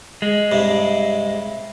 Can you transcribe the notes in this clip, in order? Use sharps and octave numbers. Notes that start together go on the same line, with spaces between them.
G#3
G2 C3